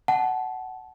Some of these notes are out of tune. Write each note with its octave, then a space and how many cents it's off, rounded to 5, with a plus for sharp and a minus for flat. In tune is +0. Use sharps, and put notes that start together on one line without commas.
F#5 +15 A5 -25